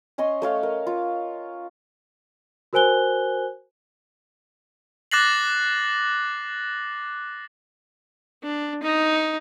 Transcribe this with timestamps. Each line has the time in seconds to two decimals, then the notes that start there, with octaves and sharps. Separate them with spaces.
0.18 C#4 C#5 D#5 C6
0.42 A3 C#5 F5
0.63 A#4
0.87 F4
2.73 F#4 A#4 C5 G#5 F#6 G7
5.11 D6 F#6 A6 A#6 C7 F#7
8.43 D4
8.83 D#4